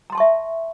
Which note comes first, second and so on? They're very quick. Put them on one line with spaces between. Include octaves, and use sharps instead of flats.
A#5 C6 A5 C#6 E5